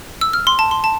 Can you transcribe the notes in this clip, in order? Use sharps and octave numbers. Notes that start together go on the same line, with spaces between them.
E6
F6
C6
A5
C6
A5